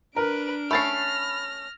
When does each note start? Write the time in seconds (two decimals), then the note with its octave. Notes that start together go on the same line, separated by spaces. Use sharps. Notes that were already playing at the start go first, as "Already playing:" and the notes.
0.16 D4 A#4 B4 D7
0.71 A3 C#4 B5 F6 A6 C7
1.00 A#6